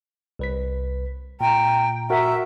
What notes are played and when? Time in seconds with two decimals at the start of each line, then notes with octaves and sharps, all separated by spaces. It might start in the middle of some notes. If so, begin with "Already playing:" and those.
0.39 C2 B4 B6
1.41 A#2 G5 A#5
2.10 F#4 A#4 E5 F#5 A#5